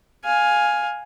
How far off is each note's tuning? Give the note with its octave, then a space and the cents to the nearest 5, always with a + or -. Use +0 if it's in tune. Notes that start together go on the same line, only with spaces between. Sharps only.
F5 +15 G#5 +0